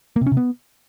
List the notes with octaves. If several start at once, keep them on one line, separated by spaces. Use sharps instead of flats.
A#3
C3
C#4
C3
B3